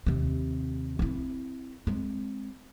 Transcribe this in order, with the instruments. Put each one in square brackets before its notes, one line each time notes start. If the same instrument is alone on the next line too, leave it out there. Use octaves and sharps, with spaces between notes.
[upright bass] D#2 C3
C4 E4
G#3 C4